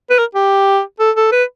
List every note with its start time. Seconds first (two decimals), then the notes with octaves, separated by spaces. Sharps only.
0.10 B4
0.19 A#4
0.35 G4
0.99 A4
1.16 A4
1.32 B4